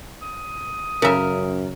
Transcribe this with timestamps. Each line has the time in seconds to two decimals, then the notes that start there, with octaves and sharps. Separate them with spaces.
0.22 D#6
1.02 F#2 C#3 A#4 E5